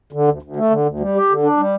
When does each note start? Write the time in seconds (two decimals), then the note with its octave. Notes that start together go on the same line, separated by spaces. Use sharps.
0.12 D3
0.28 D2
0.42 D2
0.56 A3
0.70 D3
0.86 D2
1.00 G3
1.15 G4
1.29 D3
1.43 D4
1.57 G3